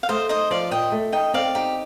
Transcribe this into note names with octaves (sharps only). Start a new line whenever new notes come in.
F5
A3 C5 D#5
D#4 C5 D#5
F3 D5 F5
A#2 D#5 G5
A3
D#4 D#5 G5
C4 D5 F5
D#4 G4